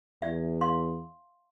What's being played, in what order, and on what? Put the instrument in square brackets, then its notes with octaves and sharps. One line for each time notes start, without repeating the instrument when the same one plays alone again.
[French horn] E2 [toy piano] D5 E5
[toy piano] F5 C6